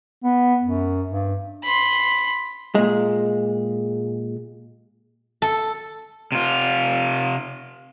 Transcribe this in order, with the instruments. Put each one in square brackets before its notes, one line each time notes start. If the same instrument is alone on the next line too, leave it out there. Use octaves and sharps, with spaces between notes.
[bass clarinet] B3
F#2
G2
[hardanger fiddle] B5 C6
[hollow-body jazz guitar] A#2 G#3
[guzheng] A4
[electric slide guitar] C3 F4